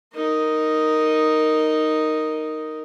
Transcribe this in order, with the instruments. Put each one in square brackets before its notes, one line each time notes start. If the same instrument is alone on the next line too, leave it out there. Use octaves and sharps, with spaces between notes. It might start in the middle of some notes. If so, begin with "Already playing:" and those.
[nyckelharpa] D#4 A#4